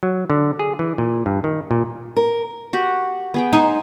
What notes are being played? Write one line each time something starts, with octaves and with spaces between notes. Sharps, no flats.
F#3
D3
G#4
E3
A#2
G2
D#3
A#2
A#4
F#4 G4 F#5
B3 G#4 G5
D#4 C5 G#5